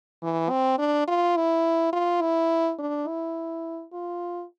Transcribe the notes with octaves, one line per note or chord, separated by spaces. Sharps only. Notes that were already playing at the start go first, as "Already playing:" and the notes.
E3
C4
D4
F4
E4
F4
E4
D4
E4
F4